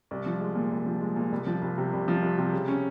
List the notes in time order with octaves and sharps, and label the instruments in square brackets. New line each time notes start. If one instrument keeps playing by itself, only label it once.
[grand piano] C2
F3
G#3
A#2
C2
F3
G#3
A#2
C2
F3
C2
C3
C2
F3
C2
C3
C#3
C#4